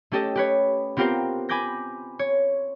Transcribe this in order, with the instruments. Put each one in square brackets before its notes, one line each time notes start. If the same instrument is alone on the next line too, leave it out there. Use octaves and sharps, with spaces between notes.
[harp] A3 C#4 G4 A4 D#5
G4 B4 C#5
B3 C4 F4 G4 A#4 C5
G#5 B5 D6 G6 A#6
C#5